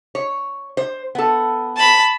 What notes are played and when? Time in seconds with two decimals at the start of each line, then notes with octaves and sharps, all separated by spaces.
0.15 C#5
0.77 C5
1.15 B3 A4
1.77 A5 B5